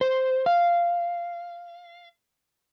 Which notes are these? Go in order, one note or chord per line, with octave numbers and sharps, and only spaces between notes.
C5
F5